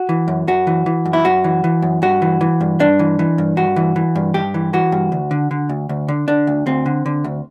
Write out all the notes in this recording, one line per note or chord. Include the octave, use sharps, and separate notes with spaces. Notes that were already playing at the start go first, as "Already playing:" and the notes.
Already playing: F#4
E3
F#2
F#2 F#4
E3
E3
F#2
E4
F#2 F#4
E3
E3
F#2
G2 F#4
E3
E3
G2
G2 D4
E3
E3
G2
G2 F#4
E3
E3
G2
G2 G4
E3
E3 F#4
G2
D2
D3
D3
D2
D2
D3
D3 D4
D2
D2 C4
D3
D3
D2